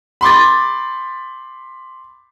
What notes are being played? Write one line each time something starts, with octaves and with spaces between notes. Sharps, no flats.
B5 C6 D6 A6